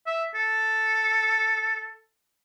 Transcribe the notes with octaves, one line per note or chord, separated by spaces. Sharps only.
E5
A4